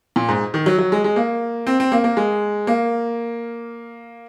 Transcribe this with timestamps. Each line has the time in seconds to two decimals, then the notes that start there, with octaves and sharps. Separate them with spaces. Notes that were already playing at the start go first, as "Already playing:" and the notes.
0.16 A#2
0.29 G#2
0.54 D#3
0.66 F#3
0.78 F#3
0.92 G#3
1.04 G#3
1.16 A#3
1.67 C4
1.80 C4
1.92 A#3
2.04 A#3
2.17 G#3
2.67 A#3